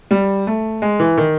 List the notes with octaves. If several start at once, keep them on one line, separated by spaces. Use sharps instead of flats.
G3
A3
G#3
E3
D#3